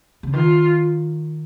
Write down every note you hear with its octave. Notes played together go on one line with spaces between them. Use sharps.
C#3
D#3 F4